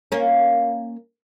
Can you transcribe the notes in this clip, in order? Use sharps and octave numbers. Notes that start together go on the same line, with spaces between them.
A#3 C#4